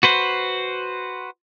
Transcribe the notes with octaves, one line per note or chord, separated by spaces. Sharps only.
F#4 B4 C5